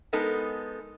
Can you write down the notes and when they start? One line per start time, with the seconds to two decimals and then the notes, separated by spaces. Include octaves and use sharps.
0.13 G#3 B3 D#4 A4 A#4